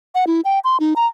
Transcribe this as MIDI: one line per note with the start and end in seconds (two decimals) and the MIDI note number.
0.15 0.25 78
0.27 0.41 64
0.45 0.59 79
0.64 0.77 84
0.80 0.94 63
0.96 1.06 82